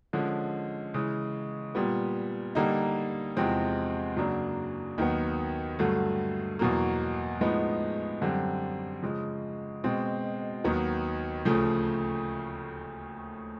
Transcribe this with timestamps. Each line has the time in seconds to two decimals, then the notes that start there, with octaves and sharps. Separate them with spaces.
0.13 D3 F3 G#3 C#4
0.94 C#3 E3 G#3
1.75 A#2 G3 B3
2.55 D3 G3 A#3 D#4
3.37 E2 C3 F3 G#3 C4
4.17 F#2 C#3 F#3 A#3 D4
4.98 D#2 D#3 F#3 B3
5.79 G2 D3 F#3 A3
6.59 E2 B2 F#3 A#3
7.41 A2 F3 G#3 B3 D#4
8.22 F#2 D3 G3 C4
9.02 C#3 F3 G#3
9.84 B2 G#3 C4
10.64 D#2 D#3 F#3 B3
11.45 D2 C#3 F3 A3